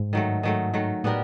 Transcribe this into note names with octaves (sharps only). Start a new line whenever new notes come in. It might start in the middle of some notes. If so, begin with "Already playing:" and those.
Already playing: G#2
D#3 F#3 A3
D#3 F#3 A3
D#3 F#3 A3
A2 B3 D4 G4 A#4